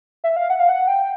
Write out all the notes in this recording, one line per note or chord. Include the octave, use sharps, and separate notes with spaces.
E5
F5
F#5
F5
F#5
G5